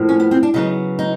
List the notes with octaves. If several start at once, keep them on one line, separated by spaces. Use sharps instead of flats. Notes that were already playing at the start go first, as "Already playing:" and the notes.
Already playing: A2 F3 A#3
C#4
B3
C4
D4
C#3 F#3 B3 D#4
D#4